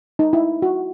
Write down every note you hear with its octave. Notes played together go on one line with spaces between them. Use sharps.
D#4
E4
F#4